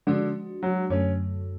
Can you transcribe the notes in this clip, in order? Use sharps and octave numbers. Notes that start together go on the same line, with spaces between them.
D3 F3 G#3 D4 F#4
F#3
F#2 D3 F#3 A3 C#4